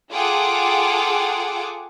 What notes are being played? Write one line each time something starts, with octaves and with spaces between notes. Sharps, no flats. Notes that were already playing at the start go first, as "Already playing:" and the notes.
F4 G#4 A4 F#5 G5 D6